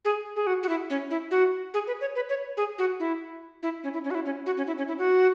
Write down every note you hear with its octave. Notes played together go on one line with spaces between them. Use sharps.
G#4
G#4
F#4
F#4
E4
C#4
E4
F#4
G#4
B4
C#5
B4
C#5
G#4
F#4
E4
E4
C#4
E4
C#4
F#4
E4
C#4
F#4
C#4
E4
C#4
E4
F#4